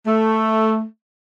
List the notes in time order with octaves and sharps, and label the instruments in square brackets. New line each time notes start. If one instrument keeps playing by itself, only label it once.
[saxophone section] A3